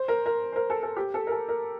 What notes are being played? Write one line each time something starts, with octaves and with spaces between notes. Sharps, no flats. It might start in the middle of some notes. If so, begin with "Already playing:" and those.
Already playing: C5
A#4
A#4
C5
A#4
A4
A4
G4
A4
A#4
A4
A#4